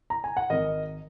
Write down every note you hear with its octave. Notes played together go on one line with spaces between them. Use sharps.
A#5
G#5
F#5
G#1 A#4 D#5